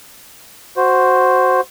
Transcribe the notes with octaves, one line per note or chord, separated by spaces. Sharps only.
F#4 C5